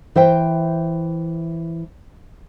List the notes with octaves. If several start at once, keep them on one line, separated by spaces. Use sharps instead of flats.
E3 C5 E5 G5